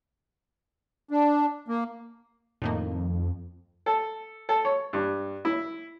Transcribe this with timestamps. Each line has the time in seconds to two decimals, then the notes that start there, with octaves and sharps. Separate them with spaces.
1.11 D4
1.68 A#3
2.62 F2 A2 D#3 A#3
3.86 A4
4.49 A4
4.65 C#5
4.93 G2
5.45 E4